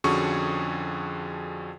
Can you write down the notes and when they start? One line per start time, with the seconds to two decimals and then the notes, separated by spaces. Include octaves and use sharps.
0.04 F2 D3 C#4 F#4 G#4 C#6